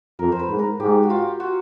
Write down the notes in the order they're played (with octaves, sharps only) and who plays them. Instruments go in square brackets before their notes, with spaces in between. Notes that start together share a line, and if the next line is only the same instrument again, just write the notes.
[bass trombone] F2 [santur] A#4
[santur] C5
B4
[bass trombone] G#2
[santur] A#4
[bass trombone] G#2 [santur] G4
[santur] F#4
F4
F#4